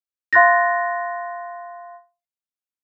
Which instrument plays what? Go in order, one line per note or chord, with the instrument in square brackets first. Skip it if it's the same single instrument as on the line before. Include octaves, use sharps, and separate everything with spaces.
[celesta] F5 C6 F#6 A6 A#6